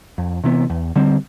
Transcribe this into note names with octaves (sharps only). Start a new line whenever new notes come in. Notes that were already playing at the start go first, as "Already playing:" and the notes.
F2
C3 E3 B3
E2
D3 G3 C4